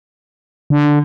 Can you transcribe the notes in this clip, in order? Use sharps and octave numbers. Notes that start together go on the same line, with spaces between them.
D3